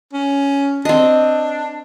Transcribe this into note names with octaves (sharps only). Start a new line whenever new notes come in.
C#4
C4 D4 D#5